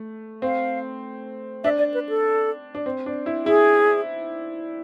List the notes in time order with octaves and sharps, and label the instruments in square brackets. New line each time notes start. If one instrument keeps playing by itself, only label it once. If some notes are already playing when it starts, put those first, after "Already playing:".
Already playing: [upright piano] A3
[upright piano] C4 [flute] F5
[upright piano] D4 [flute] E5
[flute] D5
B4
A4
[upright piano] D4
C4
D4
E4
[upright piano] E4 [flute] G#4